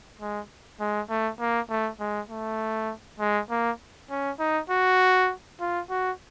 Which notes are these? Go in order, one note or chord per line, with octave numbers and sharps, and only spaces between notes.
G#3
G#3
A3
A#3
A3
G#3
A3
G#3
A#3
C#4
D#4
F#4
F4
F#4